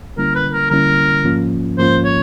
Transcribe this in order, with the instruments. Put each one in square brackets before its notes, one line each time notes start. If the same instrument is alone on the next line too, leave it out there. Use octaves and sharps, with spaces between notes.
[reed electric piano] D3 G3 A#3 C#4 E4 [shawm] A#4
[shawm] B4
A#4
[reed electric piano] D3 G3 A#3 C#4 E4 [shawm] A#4
[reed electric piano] G#2 F3 A#3 C#4 F4
[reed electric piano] G#2 F3 A#3 C#4 F4 [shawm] C5
[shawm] C#5